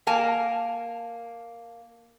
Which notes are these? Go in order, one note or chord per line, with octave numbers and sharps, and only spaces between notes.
A#3 A#4 G#5 A5